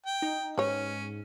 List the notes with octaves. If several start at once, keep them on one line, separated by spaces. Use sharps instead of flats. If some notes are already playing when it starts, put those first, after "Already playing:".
G5
D#4
G#2 C#4 B4 C#5